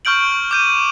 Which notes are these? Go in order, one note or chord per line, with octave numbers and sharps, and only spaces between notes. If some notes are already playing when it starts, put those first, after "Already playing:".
C#6 F6 G6 D7 F#7
D6 G6 D#7